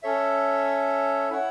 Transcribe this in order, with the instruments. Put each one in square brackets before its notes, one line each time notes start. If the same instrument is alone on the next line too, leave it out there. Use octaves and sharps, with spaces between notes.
[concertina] C#4 A4 C#5 E5
E4 C#5 F#5